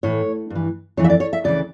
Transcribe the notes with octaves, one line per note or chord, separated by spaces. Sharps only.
A2 E3 C#5
G2
E3
F2 E3 C#5
E5
D5
C#5
E5
D2 C#3 E3 D5